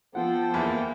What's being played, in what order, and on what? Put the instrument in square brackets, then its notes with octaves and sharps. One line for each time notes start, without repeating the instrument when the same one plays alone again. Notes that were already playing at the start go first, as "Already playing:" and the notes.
[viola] F3 [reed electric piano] B3 F4 F#5 [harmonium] A4 C5 G5
[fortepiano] E2 [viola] A#3